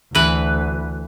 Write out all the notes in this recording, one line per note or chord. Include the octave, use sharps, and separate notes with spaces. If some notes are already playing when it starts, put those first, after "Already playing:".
D2 E3 B4